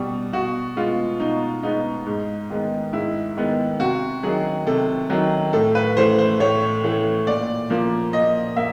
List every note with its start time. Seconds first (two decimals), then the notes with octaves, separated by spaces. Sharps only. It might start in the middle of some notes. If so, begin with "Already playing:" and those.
Already playing: B2 G3
0.33 B2 F#4
0.76 G#3 B3 F4
1.20 B2 D#4
1.63 G#3 B3 D#4
2.06 G#2
2.50 D#3 G#3 B3
2.93 G#2 E4
3.37 D#3 G#3 B3
3.80 C3 F#4
4.23 D#3 F#3 G#4
4.67 C3 A4
5.10 D#3 F#3
5.53 A2 A4
5.75 B4
5.97 E3 A3 C5
6.18 C5
6.40 A2 C#5
6.84 E3 A3
7.27 A#2 D5
7.70 F3 A#3
8.13 A#2 D#5
8.56 A#3 E5